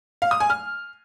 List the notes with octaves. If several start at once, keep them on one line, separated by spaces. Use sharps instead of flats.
F5
D#6
G#5
F6